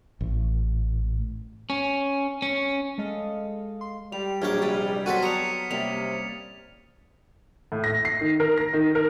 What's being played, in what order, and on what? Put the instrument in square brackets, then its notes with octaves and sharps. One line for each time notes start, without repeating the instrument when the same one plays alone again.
[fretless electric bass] A1
[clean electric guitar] C#4
C#4
[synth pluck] G#3 A4 D#5 F5
C6
[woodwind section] G3 [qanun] G4 [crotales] F7
[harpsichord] A#1 C#4 G5 [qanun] F#3 A#3 D6 [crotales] F6 G#6
[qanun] C3 G#3 B4 [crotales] A6
[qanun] F#3 B3 F#5 [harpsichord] F#4 A4 C5 [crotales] B6 D#7
[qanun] E5 A5 [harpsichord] A#5 [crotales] D#6 C#7 F7
[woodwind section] C3 [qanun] G3 A#3 C#4 [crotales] F7
[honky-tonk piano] A2
A#6
C7
D#3
A#4
A#6
D#3
A#4